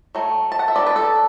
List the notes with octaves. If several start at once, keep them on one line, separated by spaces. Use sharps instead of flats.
F#3 A3
A5
F#5
E5
F#3 A3 D4 D5
B4
A4